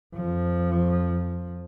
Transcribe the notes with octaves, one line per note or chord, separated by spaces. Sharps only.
F2 F3